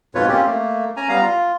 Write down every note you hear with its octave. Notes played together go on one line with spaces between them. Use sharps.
F2 G#2 B2 F4 B4 C#5
A#3 C4 C#4 F4 G4
A3 A#3
C#4 G#5 A#5
G3 B3 F5 A#5
F4